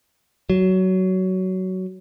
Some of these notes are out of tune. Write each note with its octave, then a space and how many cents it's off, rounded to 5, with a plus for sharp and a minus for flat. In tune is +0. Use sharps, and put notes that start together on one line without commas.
F#3 +15